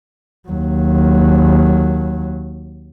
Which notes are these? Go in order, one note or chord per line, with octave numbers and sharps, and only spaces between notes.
D#2 F#3